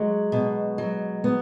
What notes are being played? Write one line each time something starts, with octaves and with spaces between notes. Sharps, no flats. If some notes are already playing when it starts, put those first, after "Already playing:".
Already playing: F#3 G#3
B2
F#3
B3